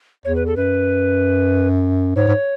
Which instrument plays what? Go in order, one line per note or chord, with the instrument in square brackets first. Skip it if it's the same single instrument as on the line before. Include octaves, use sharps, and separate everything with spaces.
[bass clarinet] E2 [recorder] C#5
[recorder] B4
A4
[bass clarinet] F#2 [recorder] B4
[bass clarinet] G#2 [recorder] C#5
[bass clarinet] G#2